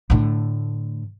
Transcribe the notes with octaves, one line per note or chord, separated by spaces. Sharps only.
A2 D3